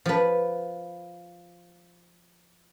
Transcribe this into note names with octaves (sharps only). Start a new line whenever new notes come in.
F3 B4